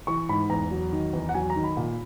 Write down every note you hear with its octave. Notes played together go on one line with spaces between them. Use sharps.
E3 C#6
G#2 B5
E2 A#5
F#3
D#3
E2
F#5
F#3 G#5
A#5
D#3
B5
A#2